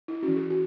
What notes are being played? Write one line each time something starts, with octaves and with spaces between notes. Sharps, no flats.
E4
C#4 F#4
E3
G#4
F#4